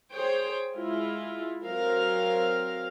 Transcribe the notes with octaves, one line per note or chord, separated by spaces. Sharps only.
G#4 C5 C#5 G5
G#3 E4 F4
F#3 C4 A#4 F5